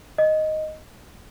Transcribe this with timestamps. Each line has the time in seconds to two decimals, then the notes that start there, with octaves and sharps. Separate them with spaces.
0.18 D#5